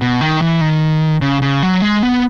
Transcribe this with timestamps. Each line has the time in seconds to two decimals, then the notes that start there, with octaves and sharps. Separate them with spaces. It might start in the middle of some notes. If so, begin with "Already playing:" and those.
0.01 B2
0.21 D#3
0.42 E3
0.61 D#3
1.21 C#3
1.42 C#3
1.63 F#3
1.82 G#3
2.03 B3